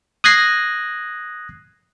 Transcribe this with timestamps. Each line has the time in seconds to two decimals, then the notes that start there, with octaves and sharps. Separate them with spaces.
0.24 D#6 F#6 G#6 A#6 C7